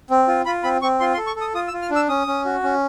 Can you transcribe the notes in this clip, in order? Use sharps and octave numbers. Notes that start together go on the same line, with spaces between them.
C4
F4
F4 B5
C4 B5
C4 C#6
F4 C6
C6
A4
C#6
A4
D#6
F4 D#6
E6
F4
F6
D4
E6
C#4 D#6
C#4
F#4
C#4